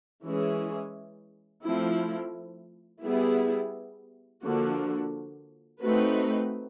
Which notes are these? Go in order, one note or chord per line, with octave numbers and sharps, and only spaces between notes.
E3 G#3 C#4 E4 G#4
F3 A3 C4 E4
G3 B3 E4 G#4
D3 F3 A#3 D4 F#4
A3 C4 D#4 F#4 B4